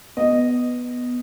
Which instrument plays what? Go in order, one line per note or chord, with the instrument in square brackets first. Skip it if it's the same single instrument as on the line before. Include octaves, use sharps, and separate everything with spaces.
[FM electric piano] B3 [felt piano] D#5